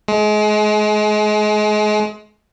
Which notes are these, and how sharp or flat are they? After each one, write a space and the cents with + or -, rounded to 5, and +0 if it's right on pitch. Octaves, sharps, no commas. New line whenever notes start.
G#3 +30